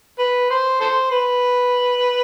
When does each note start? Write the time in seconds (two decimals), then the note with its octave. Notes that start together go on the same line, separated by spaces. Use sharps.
0.19 B4
0.50 C5
0.81 A4 C5
1.11 B4